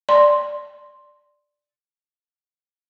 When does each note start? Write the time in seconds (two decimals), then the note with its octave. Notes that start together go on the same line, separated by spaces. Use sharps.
0.09 D5 C6